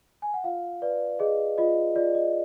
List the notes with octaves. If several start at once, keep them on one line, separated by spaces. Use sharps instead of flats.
G#5
F#5
F4 F5
B4 D5
G#4 D#5
F4 D#5
F4 D5
D#5